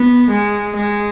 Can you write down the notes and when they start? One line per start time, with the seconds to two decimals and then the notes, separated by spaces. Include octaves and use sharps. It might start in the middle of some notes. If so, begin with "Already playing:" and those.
Already playing: B3
0.31 G#3
0.75 G#3